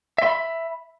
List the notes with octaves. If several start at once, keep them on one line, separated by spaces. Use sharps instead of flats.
E5 B5 C6